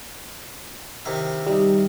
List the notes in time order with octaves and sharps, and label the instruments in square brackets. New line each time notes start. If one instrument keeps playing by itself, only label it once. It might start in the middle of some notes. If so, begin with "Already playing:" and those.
[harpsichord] C3 D#3 E4
[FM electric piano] G3 D#4